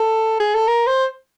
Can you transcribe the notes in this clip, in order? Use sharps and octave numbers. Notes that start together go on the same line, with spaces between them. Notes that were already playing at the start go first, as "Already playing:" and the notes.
Already playing: A4
G#4
A4
A#4
C5